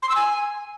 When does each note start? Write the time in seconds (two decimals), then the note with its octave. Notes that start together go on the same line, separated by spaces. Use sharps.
0.03 C6
0.09 E6
0.16 G#5